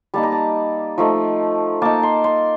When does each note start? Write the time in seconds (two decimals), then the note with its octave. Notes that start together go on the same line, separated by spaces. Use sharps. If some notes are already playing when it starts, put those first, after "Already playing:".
0.14 G3 A#3 D#4 A5
0.23 A#5
0.32 A5
0.98 F3 A3 D#4
1.82 A#3 D#4 A5
2.03 C6
2.24 C6